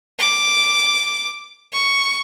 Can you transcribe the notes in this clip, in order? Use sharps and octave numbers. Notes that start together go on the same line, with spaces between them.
D6
C#6